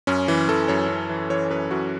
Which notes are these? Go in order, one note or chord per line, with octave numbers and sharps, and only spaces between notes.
F#2 C#4
E3
E3 A4
F#2 C#5
F#2
E3
E3 C#5
F#2 B4
F#2 F#4